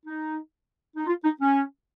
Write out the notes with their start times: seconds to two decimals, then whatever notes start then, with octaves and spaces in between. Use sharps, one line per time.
0.06 D#4
0.97 D#4
1.07 F4
1.24 D#4
1.41 C#4